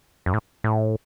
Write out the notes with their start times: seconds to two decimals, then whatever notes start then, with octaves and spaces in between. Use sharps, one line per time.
0.26 F#2
0.34 A2
0.64 A2